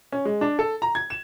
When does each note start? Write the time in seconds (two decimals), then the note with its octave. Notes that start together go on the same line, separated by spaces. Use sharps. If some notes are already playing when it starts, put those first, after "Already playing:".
0.12 C#4
0.25 G#3
0.41 D4
0.59 A4
0.82 A#5
0.95 G#6
1.10 E7